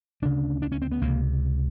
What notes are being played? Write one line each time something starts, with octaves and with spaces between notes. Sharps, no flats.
D2 C#3 D4
D4
C#4
C4
B3
C#2 C3 A#3